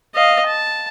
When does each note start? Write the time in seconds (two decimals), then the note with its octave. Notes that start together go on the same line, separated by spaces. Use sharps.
0.15 D#5 F5
0.47 A5